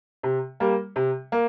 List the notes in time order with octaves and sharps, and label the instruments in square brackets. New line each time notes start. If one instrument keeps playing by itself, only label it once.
[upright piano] C3
G3 A#3
C3
A#3